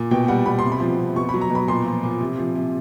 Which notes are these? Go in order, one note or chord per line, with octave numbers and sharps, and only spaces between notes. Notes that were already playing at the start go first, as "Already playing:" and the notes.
Already playing: A#2
B2 G5
G3 F#5
B2 B5
C6
C3
B5
F3
C3
B2 C#6
F#3 B5
A#5
B2
B5
A#2 C6
F3
A#2
C3
F3
C3